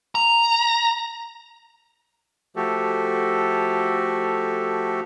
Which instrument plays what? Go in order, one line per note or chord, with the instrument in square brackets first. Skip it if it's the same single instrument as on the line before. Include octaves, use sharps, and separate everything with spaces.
[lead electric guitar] A#5
[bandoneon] F3 A3 F#4 G4 A4